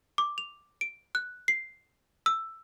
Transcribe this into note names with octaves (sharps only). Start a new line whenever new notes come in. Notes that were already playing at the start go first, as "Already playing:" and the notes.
D6
F7
D7
F#6
C7
E6